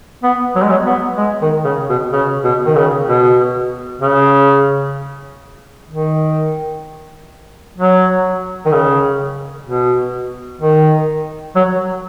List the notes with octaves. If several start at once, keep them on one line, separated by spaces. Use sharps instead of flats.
B3
F#3
G#3
F#3
B3
G#3
D#3
C#3
B2
C#3
B2
D#3
C#3
B2
C#3
D#3
F#3
D#3
C#3
B2
D#3
F#3